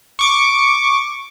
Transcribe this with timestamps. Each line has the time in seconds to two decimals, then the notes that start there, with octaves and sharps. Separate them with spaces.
0.19 C#6 D6 C#7